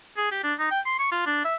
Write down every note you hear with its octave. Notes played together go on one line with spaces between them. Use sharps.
G#4
G4
D4
D#4
G5
C6
C#6
F4
D4
E5